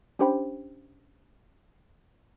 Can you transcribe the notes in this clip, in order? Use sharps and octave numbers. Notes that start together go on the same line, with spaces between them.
C#4 D4 G4 C5 G5 B5